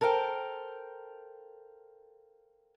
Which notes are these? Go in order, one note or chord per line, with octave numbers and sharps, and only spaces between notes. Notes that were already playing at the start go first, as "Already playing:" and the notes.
A4 A#4 C5 F5 G5